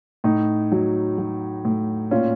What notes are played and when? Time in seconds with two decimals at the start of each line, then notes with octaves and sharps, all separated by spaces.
0.24 A2 D#4
0.72 F#3
1.18 F#3
1.65 A2
2.11 A#2 C#4 F4